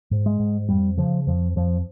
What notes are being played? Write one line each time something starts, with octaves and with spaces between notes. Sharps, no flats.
G#2
G#3
G#2
F2 G3
C#3 F3
F2 F3
F2 F3